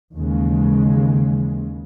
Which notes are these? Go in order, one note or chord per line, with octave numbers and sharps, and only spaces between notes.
D#2 C#3 E3 G#3